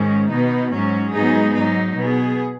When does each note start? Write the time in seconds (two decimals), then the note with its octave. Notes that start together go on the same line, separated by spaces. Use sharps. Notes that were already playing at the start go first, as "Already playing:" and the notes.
Already playing: G#2 D#3 G#3 C#4
0.29 B2 B3 D#4
0.71 G#2 F#3 C#4
1.14 G#2 F#3 B3 D#4 G#4
1.56 G#2 F#3 D#4
1.97 B2 B3 G#4